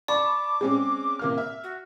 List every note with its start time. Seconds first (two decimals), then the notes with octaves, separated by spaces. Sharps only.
0.08 D5 A5 B5 C#6 D6
0.61 G#3 C4 C#4
1.19 C3 A#3 F6
1.38 E5
1.63 F#4